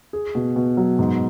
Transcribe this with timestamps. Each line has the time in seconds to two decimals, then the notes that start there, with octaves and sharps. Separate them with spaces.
0.13 G#4
0.35 B2
0.56 B2
0.77 F#3
0.99 G#2